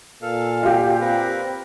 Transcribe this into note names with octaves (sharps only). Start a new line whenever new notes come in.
A#2 A4 F5
F4 G4
C4 A#4 B4